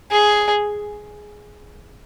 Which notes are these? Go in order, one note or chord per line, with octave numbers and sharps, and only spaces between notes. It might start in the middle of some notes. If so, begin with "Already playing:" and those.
G#4